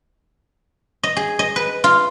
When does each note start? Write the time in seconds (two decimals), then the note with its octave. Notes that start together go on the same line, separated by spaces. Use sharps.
1.03 D#5
1.17 G#4
1.39 D#5
1.56 B4
1.84 F4